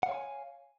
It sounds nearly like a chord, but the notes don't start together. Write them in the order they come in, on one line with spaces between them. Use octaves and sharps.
F#5 F5 C#5 C6 G#5